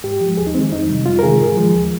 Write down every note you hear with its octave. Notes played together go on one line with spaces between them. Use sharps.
G#2 G4
F3
G#3
D#2 G#4
D#4
D#3 G#3 C4
F2 D#4
C3 G3
F2 F4
A#4
C3 D#3 G#3 G#4
G#2
F3 G#3
D#2